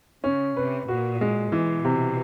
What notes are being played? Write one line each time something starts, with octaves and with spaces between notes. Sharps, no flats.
C#3 C#4
C3 B4
A#2 F#4
G#3
B2 E3
C3